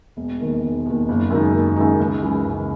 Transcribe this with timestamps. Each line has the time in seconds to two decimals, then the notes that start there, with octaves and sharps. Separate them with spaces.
0.17 E1
0.40 D#2 D#3
0.63 E1
0.86 D#2 D#3
1.09 F#1
1.30 F#2 D#3 G#3 D#4
1.53 F#1
1.76 F#2 D#3 G#3 D#4
2.00 C#2
2.21 C#3 E3 G#3
2.45 C#2